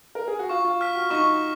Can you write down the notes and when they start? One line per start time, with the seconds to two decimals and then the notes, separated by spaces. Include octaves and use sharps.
0.15 A#4
0.28 G#4
0.39 F#4
0.49 F4 C#6
0.65 F4
0.81 F6 B6
0.96 F#4
1.11 D#4 C#6